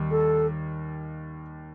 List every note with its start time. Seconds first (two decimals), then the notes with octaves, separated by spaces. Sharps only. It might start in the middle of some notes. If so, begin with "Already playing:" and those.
Already playing: D#2 D#3 G3
0.11 A4